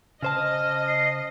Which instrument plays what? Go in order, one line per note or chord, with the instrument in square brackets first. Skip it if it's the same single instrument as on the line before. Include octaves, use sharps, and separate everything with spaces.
[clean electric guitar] C#3 C5 A5 [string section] D#5 [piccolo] F6
[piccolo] C7